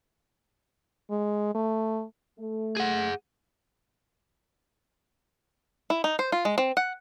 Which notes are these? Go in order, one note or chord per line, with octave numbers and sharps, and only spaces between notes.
G#3
A3
A3
G#4 F#5
E4
D#4
C5
F4
G#3
C4
F#5